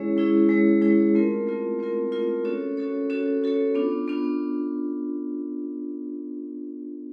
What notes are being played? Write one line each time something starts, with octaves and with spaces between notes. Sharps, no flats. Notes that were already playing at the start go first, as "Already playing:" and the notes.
Already playing: G#3 C#4 E4 G#4 C#5
G#3 C#4 E4 G#4 C#5
G#3 C#4 E4 G#4 C#5
G#3 C#4 E4 G#4 C#5
A3 C4 F4 A#4
A3 C4 F4 A#4
A3 C4 F4 A#4
A3 C4 F4 A#4
C#4 F#4 A4 C#5
C#4 F#4 A4 C#5
C#4 F#4 A4 C#5
C#4 F#4 A4 C#5
B3 D4 F4
B3 D4 F4